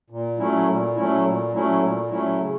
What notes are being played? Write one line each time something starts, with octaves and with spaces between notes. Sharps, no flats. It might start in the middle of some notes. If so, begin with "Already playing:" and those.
A#2
F#3 A3 C#4 E4
A#2
F#3 A3 C#4 E4
A#2
F#3 A3 C#4 E4
A#2
F#3 A3 C#4 E4
C#3